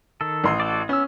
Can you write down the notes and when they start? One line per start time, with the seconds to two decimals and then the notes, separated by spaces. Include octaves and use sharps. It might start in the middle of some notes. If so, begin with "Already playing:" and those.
0.21 D#3 A4
0.44 A1 C6 D#6
0.60 F#4 A4 D5
0.89 B3 C#4 E6